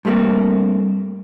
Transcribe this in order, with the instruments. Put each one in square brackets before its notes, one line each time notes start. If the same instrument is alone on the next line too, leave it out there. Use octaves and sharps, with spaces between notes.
[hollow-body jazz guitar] G2 G3 A3 A#3 C4